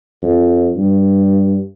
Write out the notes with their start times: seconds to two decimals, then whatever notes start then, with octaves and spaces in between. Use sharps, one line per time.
0.23 F2
0.76 G2